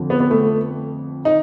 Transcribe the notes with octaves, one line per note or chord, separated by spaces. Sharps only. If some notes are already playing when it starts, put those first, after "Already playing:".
Already playing: F2 D3 F3
B3
B3
A3
D#4